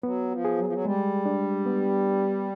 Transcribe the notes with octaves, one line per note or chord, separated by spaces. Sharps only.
F#3 B3
F3
G#4
F#3
F3
F#3
G3 G#3
D4
B3